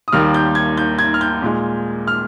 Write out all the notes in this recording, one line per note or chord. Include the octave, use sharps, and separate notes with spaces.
D#6
D#2 D#3 G3 A#3 F6
G6
G#6
G6
G#6
F6
G6
A#2 G#3
F6